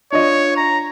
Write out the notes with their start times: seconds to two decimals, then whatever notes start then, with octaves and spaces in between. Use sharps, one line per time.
0.12 D4 F4 C#5 D#5
0.57 A#5